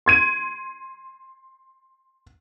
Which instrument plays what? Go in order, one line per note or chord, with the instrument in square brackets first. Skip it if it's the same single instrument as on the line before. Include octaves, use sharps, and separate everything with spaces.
[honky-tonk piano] C6 G#6 D#7